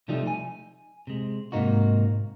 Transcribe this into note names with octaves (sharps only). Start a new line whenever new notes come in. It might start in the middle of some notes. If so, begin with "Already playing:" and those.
C3 F3 G3 A3 D#4 G4
G#5
C3 G#3
G#2 C3 A#3 D#4 F#4